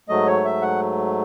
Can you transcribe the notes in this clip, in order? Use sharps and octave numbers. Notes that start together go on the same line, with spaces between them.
G#2 F#3 A3 D#5
C#5
E5
F#5